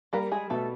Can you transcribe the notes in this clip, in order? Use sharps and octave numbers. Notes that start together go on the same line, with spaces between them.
G3 A#3 A#4
G#3 G#4
B2 A3 A4